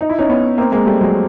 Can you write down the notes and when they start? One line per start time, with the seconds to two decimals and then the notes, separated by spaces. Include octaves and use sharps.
0.01 D#4
0.09 E4
0.18 C#4 D#4
0.29 B3 C#4
0.58 A#3 C4
0.72 G#3 A#3
0.86 G3 A3
1.01 F#3 G#3